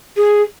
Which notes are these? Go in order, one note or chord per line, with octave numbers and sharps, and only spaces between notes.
G#4